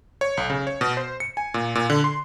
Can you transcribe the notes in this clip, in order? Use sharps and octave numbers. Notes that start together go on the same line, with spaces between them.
C#5
B1
C#3
C#5
B2
C5
C#7
G#5
A#2
A#2
D3
C6